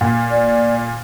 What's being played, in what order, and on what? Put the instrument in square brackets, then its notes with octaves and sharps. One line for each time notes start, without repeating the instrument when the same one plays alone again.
[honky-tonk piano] A#2
[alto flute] D5